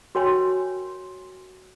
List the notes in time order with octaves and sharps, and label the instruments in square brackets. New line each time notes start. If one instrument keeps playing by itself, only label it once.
[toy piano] F#4 A#4 C#5 G5 G#5 C6